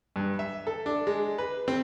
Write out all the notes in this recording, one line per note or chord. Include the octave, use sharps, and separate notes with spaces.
G2
E5
A4
D4
G#3
B4
C4